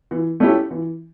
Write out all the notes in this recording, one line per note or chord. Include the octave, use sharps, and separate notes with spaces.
E3
A3 C#4 E4 G4
E3